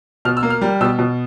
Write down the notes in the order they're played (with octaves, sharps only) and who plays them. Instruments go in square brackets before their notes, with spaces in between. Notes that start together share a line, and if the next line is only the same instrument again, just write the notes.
[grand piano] B2 F6
E6
A#3
F6
G3
B2 E6
B2